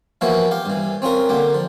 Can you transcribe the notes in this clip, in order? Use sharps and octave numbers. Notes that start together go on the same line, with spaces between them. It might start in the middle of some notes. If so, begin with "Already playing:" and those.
E3 F3 A#3 B3 E4 F#4
G4 F5
G2 E3
C4 C#4 F4 A#4
D3 A#3 G4
F3